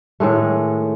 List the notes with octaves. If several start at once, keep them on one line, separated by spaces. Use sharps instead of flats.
A2 D#3 G#3 A3